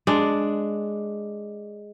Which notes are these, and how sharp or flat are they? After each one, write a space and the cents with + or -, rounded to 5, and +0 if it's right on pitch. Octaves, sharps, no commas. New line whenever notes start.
G#3 +0 D4 +0